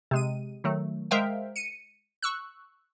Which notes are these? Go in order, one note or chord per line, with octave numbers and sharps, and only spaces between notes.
C3 G#3 D#7
D#3 F#3 A3
G#3 A#4 C5 E5 F5 G5
C#7 D#7
C#6 E6 F#6